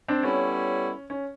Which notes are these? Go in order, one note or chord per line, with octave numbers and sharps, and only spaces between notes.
C4 D4
G3 B3 C#4 E4 A4 C#5
C#4